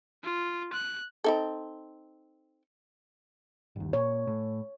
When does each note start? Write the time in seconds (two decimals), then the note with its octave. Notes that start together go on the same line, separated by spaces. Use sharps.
0.23 F4
0.73 F#6
1.24 C4 D#4 A4
3.76 G1 D#2
3.93 A#2 C#5
4.27 A2